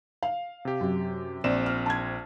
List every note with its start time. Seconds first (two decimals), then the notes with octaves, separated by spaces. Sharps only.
0.23 F5
0.65 C3 G4
0.80 F#2
1.44 A#1 C4 D5 E7
1.66 F6
1.86 A5 G#6